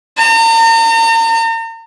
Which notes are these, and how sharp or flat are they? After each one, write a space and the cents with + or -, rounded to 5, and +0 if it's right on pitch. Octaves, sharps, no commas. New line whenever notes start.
A#5 -40